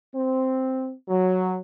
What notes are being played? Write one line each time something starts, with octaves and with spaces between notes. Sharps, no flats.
C4
F#3